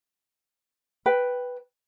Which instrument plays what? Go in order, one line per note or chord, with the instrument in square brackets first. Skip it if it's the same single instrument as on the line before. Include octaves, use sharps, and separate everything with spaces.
[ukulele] B4 G5